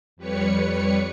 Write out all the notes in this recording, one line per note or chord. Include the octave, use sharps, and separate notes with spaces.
F2 G3 B4 C#5 C#7